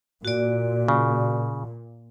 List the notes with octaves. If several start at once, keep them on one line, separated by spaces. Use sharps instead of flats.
A#2 F#4 D5
C#3